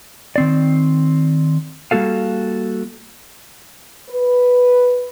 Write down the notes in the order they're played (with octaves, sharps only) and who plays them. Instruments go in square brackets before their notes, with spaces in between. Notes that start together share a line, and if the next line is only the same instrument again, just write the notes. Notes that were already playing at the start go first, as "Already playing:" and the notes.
[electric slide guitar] D#3 C4 D5
G3 A#3 F#4 A4 F5
[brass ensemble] B4